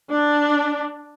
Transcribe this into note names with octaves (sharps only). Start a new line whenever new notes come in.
D4